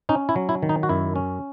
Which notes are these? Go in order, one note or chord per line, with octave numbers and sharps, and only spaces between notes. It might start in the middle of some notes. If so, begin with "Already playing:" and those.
C#4 D#4
E4
F#3
E4
D#3
D#4
F#4
F#2 E4
C#4